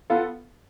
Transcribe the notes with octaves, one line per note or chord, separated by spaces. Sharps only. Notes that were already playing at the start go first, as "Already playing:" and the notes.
B3 F4 A4